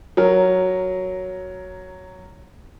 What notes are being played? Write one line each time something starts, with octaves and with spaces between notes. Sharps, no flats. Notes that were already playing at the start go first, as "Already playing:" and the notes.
F#3 A#4